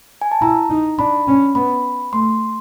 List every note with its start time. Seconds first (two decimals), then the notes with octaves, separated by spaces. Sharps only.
0.22 G#5
0.31 A5
0.41 E4 A#5
0.70 D#4
0.99 D4 B5
1.27 C#4
1.55 B3 B5
2.13 A3 C6